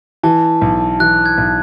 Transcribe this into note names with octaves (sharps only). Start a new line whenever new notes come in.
E3 A5
B1
E3 F#6
G#6
B1